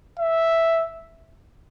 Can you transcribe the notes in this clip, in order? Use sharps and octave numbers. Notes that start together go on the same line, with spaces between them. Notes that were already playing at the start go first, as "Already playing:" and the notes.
E5